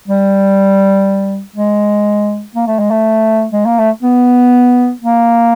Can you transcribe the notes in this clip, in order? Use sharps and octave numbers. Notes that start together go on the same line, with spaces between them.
G3
G#3
A#3
A3
G#3
A3
G#3
A#3
A3
B3
A#3